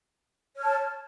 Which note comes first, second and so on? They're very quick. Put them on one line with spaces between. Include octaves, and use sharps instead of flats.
C#5 F6 A5